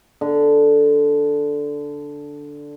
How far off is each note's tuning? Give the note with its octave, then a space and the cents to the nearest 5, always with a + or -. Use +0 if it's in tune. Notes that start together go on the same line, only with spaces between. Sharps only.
D3 -5